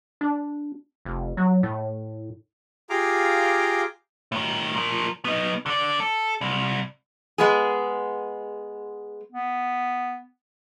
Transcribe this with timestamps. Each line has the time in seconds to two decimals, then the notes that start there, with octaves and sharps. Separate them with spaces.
0.21 D4
1.05 F1
1.37 F#3
1.63 A2
2.90 F4 G4 G#4 F5 A#5 D6
4.32 A2 D#3
4.76 F3 A#4
5.25 B3 D#4
5.66 D3 D5
6.00 A4
6.41 C2
7.38 G#3 B3 G#4
9.32 B3